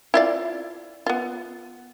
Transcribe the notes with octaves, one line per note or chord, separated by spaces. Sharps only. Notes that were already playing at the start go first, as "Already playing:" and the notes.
E4 F4 D5
B3 F4